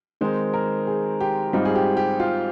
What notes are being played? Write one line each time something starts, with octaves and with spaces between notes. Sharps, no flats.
D#3 G#3 C4 D#4 C5
A#4
G#4
G4
G#2 G3 C4 D#4 F4
G#4
G4
G4
F4